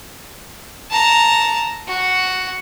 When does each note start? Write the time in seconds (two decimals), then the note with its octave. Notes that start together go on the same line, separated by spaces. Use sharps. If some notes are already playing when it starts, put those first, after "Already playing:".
0.91 A5 A#5
1.88 F#4